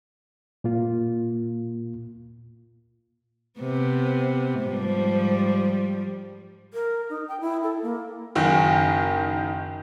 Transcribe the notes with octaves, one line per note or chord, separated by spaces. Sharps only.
A#2 A#3 F4
C3 B3
G#2 F3 G3
A#4
D#4
G5
E4
A4
A#3
F#1 D#3